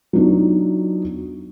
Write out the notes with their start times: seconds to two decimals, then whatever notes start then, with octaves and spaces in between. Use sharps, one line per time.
0.13 F#3 B3 D4 D#4 F4